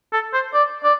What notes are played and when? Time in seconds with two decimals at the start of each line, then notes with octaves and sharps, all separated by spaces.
0.13 A4
0.34 C5
0.54 D5
0.84 D5